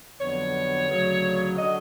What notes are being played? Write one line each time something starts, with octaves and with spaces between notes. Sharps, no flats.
F2 D3 F#3 B3 C#5
D2 C#3 F#3
D3 F#3 D#5